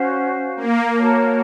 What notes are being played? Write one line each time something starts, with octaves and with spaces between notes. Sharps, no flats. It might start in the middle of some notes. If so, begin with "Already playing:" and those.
Already playing: C#4 F#4 C5 F5
A#3
F#4 A#4 C#5 A5